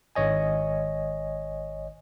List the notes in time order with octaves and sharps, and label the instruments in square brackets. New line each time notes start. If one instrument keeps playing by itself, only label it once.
[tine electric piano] G#1 C#5 D#5 G#5